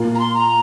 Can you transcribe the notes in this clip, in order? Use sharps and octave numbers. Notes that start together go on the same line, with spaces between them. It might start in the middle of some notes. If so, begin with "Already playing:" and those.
Already playing: A#2 A#3 F4
A#5
C6
A#5